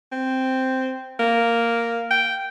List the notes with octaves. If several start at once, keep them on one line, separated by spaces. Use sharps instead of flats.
C4
A#3
G5